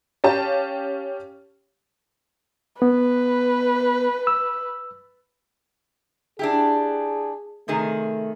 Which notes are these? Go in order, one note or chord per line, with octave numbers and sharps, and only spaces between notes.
C#4 G4 F5 A5
B3 B4
E6
D4 E4 G4 G#4
C3 D#3 A3 G#4